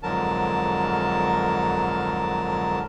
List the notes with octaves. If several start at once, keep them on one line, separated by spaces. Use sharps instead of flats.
F2 G#2 D3 F#3 A#4 A5